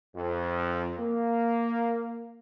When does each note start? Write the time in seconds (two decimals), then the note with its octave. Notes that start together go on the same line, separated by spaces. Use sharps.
0.15 F2
0.99 A#3